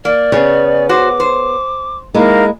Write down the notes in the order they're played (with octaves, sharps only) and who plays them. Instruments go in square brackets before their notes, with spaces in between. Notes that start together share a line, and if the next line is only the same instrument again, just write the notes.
[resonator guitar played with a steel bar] A#3 [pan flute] D5
[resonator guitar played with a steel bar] C#3 [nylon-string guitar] B3 G#4 C#5
[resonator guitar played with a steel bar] F#4 C5 [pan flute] D6
[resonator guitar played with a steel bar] C5
[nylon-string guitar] G#3 A#3 E4 [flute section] D#4 A#4 F5